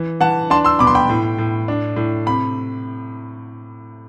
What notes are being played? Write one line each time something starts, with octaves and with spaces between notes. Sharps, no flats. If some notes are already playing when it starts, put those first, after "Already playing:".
Already playing: E3
E3 F#5 A5
D4 A5 C6
C6 E6
B2 B5 D6
C6
G5 B5
A2
A2
D4
A2
C3 B5